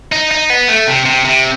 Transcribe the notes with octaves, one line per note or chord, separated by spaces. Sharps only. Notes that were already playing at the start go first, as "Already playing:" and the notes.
D#4
D#4
B3
A3
C3
C3
C3